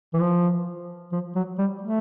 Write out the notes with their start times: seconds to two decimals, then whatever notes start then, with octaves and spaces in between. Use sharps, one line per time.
0.14 E3
0.20 F3
1.12 F3
1.35 F#3
1.58 G3
1.81 A3